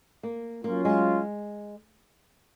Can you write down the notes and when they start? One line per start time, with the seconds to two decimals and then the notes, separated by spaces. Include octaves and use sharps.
0.23 A#3
0.64 F#3 A#3 C#4 F4
0.85 G#3